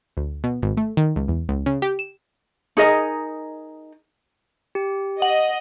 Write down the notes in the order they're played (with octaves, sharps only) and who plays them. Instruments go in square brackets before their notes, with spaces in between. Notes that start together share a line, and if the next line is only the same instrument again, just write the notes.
[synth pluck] D2
B2
G#1
A3
D#3
C#2
E2
C#2
C#3
G4
E7
[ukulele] D#4 G#4 A#4 D#5
[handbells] G4
[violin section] D#5 [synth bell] F#5